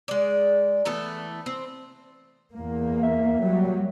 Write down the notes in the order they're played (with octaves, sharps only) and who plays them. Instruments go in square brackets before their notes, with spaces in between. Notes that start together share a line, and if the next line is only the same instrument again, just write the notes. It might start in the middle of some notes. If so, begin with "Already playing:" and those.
[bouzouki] G#3 D5
E3 A3 B3 A4
C4
[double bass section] E2 A#3
[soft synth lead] E5
[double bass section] F#3 G3